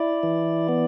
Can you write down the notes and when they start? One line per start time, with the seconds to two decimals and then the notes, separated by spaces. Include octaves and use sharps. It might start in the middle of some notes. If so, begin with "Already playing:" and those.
Already playing: E4 D5
0.23 E3
0.69 B3